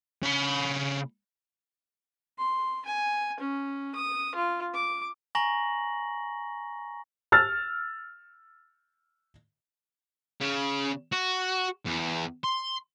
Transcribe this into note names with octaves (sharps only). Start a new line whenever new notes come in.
C#3 B5
C6
G#5
C#4
D#6
F4
D6
G#5 A#5 C#6 A#6 F#7
E6 F6 A6
C#3
F#4
E2
C6